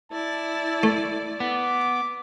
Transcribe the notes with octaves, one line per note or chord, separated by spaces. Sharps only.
E4 D5 A5
A3
B3 D6